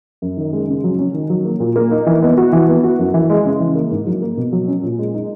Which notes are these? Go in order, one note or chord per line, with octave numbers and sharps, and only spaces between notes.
F#2
D#3
G#3
C#3
F#3
C#4
D#3
F#3
A#3
A#2
A#3
D#4
E3
B3
F#4
E3
B3
F#4
F#2
E3
G#3
C#3
E3
A#3
G#2
F#3
A#3
B2
F#3
C#4
A#2
G#3
D#4